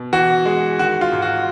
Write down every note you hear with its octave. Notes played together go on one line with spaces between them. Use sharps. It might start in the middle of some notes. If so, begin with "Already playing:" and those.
Already playing: B2
E3 F#4
G#3
D#3 F#4
F4
G#2
F#4